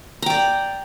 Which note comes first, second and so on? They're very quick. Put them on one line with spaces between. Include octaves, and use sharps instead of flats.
A#5 G5 D5